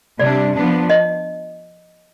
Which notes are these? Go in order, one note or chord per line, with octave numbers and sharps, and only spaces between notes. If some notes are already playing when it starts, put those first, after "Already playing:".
C3 G3 D4 D5
F3 B3 D4
D#5